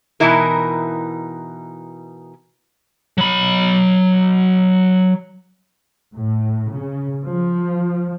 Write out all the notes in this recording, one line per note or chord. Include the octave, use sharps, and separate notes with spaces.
B2 E3 D#4 E4 A#4
F#3 B5
A2
C#3
F3